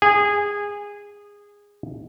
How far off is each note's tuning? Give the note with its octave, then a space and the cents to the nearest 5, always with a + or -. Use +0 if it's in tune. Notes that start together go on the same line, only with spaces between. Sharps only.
G#4 -20